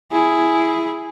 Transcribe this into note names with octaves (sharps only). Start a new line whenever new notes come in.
E4 G#4